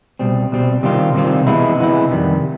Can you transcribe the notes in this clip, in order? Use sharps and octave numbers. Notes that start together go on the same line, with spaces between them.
C2 B2 G3 C4
C2 B2 G3 C4
C3 D#3 G3 C4 F4
C3 D#3 G3 C4 F4
C3 E3 G#3 B3 E4
C3 E3 G#3 B3 E4
F2 C3 D#3 G3